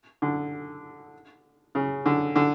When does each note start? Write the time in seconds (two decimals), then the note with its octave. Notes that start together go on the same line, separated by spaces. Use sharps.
0.22 D3
1.75 C#3
2.06 D3
2.36 D3